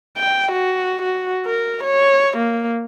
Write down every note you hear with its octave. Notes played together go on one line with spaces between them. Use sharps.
G5
F#4
F#4
A#4
C#5
A#3